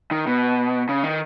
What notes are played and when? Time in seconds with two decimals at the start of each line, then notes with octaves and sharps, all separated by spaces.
0.11 D#3
0.27 B2
0.89 C#3
1.04 D#3